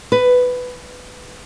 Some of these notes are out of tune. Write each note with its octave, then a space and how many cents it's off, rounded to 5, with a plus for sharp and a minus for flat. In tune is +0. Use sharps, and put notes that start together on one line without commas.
B4 +10